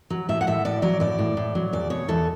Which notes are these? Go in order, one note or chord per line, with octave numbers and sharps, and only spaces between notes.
F#3
A2 E5
F#5
A2 E5
A2 D5
F#3 D5
A2 D5
A2
A2
F#3
E2 D5
B2 C#5
E2 A4